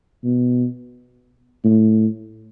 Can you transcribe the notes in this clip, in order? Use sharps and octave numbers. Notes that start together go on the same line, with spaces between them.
B2
A2